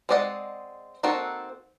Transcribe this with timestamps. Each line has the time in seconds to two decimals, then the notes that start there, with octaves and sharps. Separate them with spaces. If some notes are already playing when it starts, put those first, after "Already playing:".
0.09 G#3 C4 D5 D#5 F#5
1.03 A#3 C4 D#4 F#4 A4